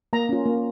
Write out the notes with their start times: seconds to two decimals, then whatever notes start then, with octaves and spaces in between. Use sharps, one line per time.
0.13 A#3 A#5
0.29 C#4 F4
0.45 A#3